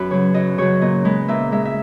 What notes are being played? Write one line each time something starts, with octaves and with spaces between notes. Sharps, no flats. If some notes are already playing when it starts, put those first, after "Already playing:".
Already playing: F#2 F#4 B4
C#3 F#3 C#5
F#2 D#5
C#3 F#3 C#5
A#2 D#5
G#3 B4
A#2 E5
G#3 E5
E5